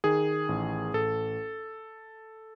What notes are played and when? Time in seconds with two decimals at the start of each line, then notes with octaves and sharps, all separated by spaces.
0.04 D#3 G#4
0.49 A1
0.93 A1 A4